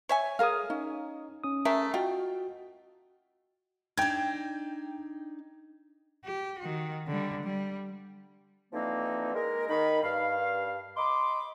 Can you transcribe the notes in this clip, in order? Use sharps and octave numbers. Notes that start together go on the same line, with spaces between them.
C#5 E5 G#5
G#4 A#4 F5 D#6 F6
C#4 D#4
C#4 D#6
A3 G#4 A#4 E5
F4 F#4 D#5 G5
D4 D#4 G5 G#6
G4
D#3 F#4
D3 G3
G3
D3 E3 F3 A#3 C4 D#4
G#3 A#4
D#3 D#4 B5
G2 F5
D#5 B5 C6 D6